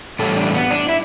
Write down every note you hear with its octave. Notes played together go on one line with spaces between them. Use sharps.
A2 E3 G3 A4
D4
B3
D4
E4